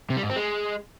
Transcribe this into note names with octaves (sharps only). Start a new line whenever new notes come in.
C3
G3
G#2
C4
G#3